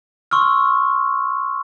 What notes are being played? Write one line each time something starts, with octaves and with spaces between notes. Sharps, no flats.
C6 C#6 E6 F6